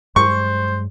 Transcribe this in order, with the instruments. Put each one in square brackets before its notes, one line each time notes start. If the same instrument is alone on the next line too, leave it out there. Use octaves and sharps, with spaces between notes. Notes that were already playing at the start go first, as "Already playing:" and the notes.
[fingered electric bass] G2 F#3 G#3 [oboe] C5 [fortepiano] C#6